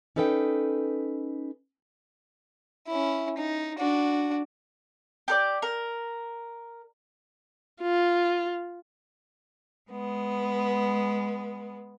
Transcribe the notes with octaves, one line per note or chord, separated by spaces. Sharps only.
C#4 D#4 A4 B4 E5 G5
C#4 E4
D#4
D4 F#4
G4 A#4 D5
A#4
F4
G#3 B3